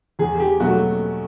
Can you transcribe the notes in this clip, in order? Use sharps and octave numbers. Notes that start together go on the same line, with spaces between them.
E2 G#4
G#4
G4
B2 F#3 A3 F#4